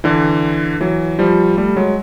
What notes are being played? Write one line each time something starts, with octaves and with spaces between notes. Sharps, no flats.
D3 E3
E3 F#3
F3 G3
G3 A3
F#3 G#3